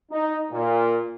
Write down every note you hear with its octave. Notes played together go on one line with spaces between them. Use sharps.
D#4
A#2